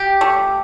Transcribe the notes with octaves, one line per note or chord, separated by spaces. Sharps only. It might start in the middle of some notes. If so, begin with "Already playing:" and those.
Already playing: G4
A3